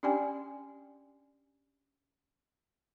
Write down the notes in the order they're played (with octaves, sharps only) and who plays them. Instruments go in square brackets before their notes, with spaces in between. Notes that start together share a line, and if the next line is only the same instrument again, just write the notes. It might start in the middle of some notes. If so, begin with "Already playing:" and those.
[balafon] C#4 D4 G4 D5 G5 G#5